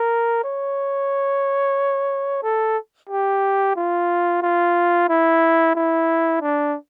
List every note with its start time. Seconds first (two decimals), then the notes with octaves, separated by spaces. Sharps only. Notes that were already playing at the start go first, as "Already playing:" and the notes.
Already playing: A#4
0.44 C#5
2.43 A4
3.10 G4
3.76 F4
4.42 F4
5.09 E4
5.75 E4
6.41 D4